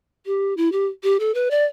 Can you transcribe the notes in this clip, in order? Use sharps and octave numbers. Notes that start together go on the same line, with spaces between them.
G4
E4
G4
G4
A4
B4
D5